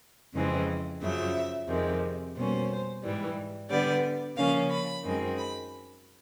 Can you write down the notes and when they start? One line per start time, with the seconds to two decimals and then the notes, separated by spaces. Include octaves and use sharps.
0.34 F2 C#3 E3 G#3 C4
1.01 F#2 C#3 F3 E5
1.68 F2 C3 D#3 G#3
2.35 B2 G3 A#3 C#4 C5
3.02 G#2 E3 G3
3.69 D3 G3 B3 D5
4.36 C#3 F3 A#3 C#4 F5
4.70 B5
5.03 F#2 D#3 G#3 C4
5.37 B5